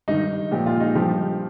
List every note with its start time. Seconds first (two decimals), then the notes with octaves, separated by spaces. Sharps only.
0.08 G2 D#3 D#4
0.51 A#2 F3 G4
0.66 F4
0.80 D#4
0.95 G2 F3 G4